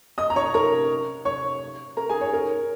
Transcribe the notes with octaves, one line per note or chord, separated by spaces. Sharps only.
D#5 D#6
A#5
C#5 C#6
A#4 A#5
C#5 C#6
A#4 A#5
G#4 G#5
C#5
A#4